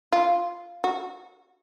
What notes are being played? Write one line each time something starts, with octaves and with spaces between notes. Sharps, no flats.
F4
F#4